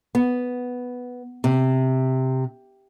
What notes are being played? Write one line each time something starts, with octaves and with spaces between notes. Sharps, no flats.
B3
C3